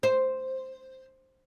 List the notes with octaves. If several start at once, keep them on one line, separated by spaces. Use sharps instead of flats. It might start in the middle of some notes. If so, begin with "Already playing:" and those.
C5